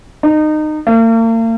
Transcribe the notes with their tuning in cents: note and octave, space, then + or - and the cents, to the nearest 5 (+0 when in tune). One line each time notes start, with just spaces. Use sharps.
D#4 -25
A#3 -45